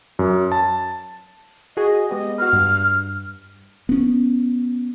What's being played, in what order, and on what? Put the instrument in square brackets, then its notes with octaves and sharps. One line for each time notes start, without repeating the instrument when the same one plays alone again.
[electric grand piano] F#2
A5
[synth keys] F#4 G#4 [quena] D#5
[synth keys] G#3 B3 G4 [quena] D#5
[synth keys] F#4 B4 [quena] F6
[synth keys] G2
[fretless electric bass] B3 C#4